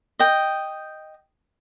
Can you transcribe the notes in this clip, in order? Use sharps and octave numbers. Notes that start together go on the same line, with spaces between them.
D#5 G5